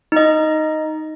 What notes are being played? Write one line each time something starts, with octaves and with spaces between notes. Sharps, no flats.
D#4 D#5